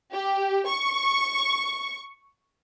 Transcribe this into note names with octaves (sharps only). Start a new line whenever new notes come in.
G4
C#6